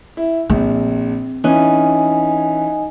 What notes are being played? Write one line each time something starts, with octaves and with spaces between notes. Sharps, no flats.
E4
A#1 C4
E3 C#4 D#4 D#5 G#5